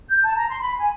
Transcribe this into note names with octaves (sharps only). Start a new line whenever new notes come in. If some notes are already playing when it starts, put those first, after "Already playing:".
G6
A5
A#5
C6
B5
G#5